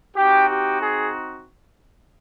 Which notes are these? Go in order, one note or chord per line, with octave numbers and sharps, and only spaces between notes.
C4 D#4 F#4 G4
G4
G#4